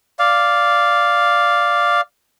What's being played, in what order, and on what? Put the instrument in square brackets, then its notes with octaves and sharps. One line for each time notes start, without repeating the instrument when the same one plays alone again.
[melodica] D5 F5